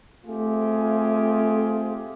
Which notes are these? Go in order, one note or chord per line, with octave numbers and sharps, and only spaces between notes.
A3 C4 F4 G4 G#4